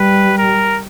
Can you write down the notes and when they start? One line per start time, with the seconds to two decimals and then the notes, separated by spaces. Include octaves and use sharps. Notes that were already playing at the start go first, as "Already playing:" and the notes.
Already playing: G3 B4
0.38 A#4